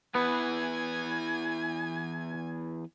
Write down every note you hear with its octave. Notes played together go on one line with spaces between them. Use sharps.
E2 E3 B3 B4 G#5